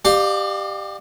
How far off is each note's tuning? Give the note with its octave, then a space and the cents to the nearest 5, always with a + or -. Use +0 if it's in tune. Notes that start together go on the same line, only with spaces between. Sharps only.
G4 +0 D5 +45 F5 +15